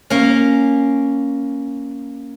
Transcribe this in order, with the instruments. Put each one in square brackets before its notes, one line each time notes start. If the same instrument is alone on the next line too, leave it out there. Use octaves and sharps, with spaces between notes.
[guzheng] A#3 C#4